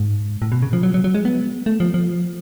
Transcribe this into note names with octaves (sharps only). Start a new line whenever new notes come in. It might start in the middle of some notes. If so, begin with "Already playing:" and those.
Already playing: G#2
A2
B2
C#3
F3
F#3
F#3
F#3
G#3
B3
A3
F3
F3